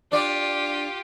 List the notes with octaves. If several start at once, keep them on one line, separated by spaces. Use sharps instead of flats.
D4 F4 G4 D5